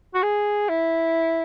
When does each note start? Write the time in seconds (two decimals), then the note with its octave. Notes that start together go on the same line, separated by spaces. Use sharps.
0.14 F#4
0.23 G#4
0.69 E4